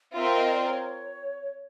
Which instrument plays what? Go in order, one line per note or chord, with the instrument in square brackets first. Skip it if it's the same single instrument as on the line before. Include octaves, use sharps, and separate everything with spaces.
[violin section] C4 F4 A#4 [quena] E5
[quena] D#5
D5
C#5